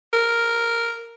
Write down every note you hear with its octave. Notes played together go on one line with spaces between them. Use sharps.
A#4